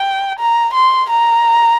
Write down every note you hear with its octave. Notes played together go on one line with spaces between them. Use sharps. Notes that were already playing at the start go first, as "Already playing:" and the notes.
Already playing: G5
A#5
C6
A#5